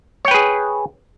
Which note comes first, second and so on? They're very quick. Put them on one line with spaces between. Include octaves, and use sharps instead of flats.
C#5 G5 B4 G#4